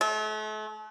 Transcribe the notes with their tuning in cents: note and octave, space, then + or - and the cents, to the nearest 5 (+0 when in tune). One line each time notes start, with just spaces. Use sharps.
A3 -40